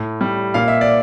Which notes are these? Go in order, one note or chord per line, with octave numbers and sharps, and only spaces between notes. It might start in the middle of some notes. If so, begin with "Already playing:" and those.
Already playing: A2
G3
A#2 F5
E5
D5